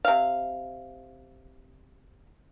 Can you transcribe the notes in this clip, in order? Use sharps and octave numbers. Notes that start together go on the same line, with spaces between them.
C3 F5